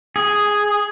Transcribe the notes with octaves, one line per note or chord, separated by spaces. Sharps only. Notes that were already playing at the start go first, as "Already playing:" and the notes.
G#4